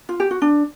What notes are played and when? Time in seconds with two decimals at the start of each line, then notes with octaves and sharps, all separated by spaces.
0.09 F4
0.20 G4
0.31 F#4
0.42 D4